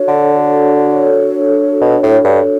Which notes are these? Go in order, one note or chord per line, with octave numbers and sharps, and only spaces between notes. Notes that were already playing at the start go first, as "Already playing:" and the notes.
Already playing: D4 F#4 A4 C#5
D3
B2
A2
G2